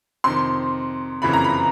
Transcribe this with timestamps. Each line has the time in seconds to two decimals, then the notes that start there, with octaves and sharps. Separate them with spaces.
0.24 F2 C3 D#3 C6
1.22 F#1 F2 C#3 E3 B5
1.33 A#5
1.44 B5